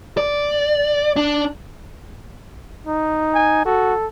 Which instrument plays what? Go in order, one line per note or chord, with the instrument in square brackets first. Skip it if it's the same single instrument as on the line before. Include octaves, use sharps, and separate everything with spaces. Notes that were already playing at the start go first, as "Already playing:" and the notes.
[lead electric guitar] D5
D4
[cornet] D#4
[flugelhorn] G#5
[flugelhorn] F#4 [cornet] A4